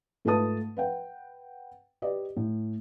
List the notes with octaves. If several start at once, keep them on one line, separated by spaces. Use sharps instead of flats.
G#2 A3 F4 B4 A5 D#6
B4 F#5 G5
G4 B4 D5 D#5
A2